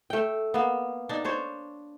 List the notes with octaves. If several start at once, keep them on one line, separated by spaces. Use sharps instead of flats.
A3 G5
A#3 B3
D4 D#4
D4 C5 C#5